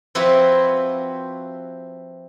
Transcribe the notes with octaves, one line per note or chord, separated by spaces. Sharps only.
F3 C4 E4 F#4 G4 B4